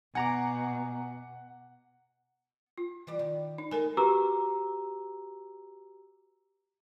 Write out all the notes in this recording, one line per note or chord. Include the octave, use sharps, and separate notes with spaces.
B2 F#5 G#5 A#5 D6
F4
E3 G3 D5
D#3
D#4
G#3 A4 A#4 G#5
F#4 G4 B4 A#5 D6 E6